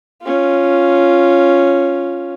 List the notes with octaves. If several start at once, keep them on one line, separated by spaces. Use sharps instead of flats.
C#4 F4